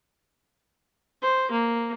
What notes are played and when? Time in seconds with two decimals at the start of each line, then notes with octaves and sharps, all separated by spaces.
1.22 C5
1.51 A#3